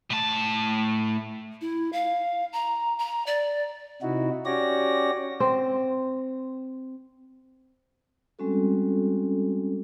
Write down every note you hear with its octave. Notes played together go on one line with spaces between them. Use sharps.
A2 A5
E4
F5
A#5
A#5
D5
C3 D#4 E4 F#4
C#4 F#4 G4 C#5 D5 A#6
C4
G3 G#3 C4 C#4 F#4 A4